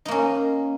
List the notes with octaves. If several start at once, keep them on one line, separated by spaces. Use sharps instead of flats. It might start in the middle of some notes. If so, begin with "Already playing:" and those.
A#3 C#4 D#4